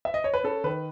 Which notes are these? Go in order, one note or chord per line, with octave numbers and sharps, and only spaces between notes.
E5
D#5
C#5
B4
C#4 A4
D#3 B4